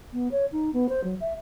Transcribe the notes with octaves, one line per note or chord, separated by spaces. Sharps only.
B3
C#5
D#4
B3
C5
F#3
E5